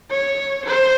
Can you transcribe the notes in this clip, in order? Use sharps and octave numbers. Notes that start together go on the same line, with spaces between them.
C#5
C5